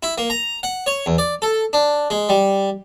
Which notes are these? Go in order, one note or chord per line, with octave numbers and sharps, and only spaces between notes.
E4
A#3
A#5
F#5
C#5
E2
D5
A4
D4
G#3
G3